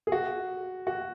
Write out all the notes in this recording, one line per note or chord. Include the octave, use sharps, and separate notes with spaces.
G#4
F#4
F#4